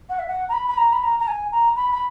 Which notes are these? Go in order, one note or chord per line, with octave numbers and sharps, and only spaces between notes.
F#5
E5
F#5
A#5
B5
B5
A#5
B5
A#5
A#5
G#5
A#5
B5
B5